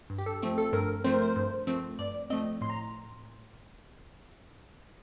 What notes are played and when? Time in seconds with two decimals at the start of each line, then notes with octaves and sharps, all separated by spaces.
0.10 G2
0.18 G4
0.26 A4
0.42 F3 A3 C4
0.58 A4
0.73 G2 A#4
1.04 F3 A3 C4 C5
1.14 A#4
1.22 C5
1.36 G2
1.67 F3 A3 C4
1.99 G2 D5
2.30 F3 A3 C4 D#5
2.61 A2 C6
2.70 A#5